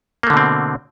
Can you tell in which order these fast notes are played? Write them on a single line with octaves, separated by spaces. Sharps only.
A#3 A3 D3 B2 C4